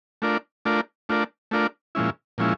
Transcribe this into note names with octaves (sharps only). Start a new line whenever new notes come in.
A3 D4 F4 A#4 D5
A3 D4 F4 A#4 D5
A3 D4 F4 A#4 D5
A3 D4 F4 A#4 D5
A#2 F3 G#3 C#4 E4
A#2 F3 G#3 C#4 E4